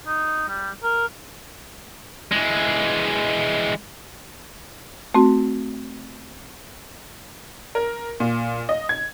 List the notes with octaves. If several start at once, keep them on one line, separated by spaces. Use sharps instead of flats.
D#4
G3
A#4
E3 G#3
A3 C4 F#4
A#4
A#2
D#5
G#6